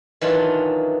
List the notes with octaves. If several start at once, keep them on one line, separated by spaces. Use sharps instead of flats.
D#3 E3 F#3 D4 F4